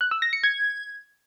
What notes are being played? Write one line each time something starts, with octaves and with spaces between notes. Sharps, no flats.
F#6
E6
A#6
C#7
G#6